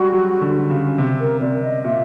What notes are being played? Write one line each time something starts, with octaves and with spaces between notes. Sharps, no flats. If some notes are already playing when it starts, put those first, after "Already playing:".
Already playing: G3 G#3 F#4
F#3
D3
C#3
C3
A#4
C3 D5
D#5
A#2 E5